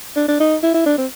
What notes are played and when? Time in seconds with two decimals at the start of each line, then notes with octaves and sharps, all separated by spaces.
0.16 D4
0.28 D4
0.40 D#4
0.63 E4
0.74 E4
0.86 D4
0.98 C4